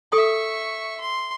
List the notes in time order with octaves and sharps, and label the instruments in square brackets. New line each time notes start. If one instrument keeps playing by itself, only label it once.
[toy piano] A4 D#6 [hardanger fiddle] E5 C#6
[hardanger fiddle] C6